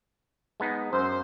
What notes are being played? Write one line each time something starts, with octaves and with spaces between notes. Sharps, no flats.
G#3 B3 D#4
F#2 C5